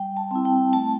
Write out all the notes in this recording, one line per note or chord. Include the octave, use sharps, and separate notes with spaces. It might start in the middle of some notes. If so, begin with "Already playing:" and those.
Already playing: G3 G5
A5
C4 E4
G5
A3 A5